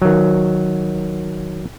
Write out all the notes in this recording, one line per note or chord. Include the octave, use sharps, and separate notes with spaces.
D#3 F#3